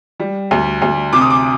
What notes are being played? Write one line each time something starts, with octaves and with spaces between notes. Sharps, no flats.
G3
D2
D2
C3 D6
D#6
D6